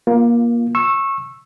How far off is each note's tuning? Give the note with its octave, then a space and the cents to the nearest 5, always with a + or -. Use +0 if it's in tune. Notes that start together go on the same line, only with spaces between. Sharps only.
A#3 +20 F4 +0
C#6 -20 E6 +0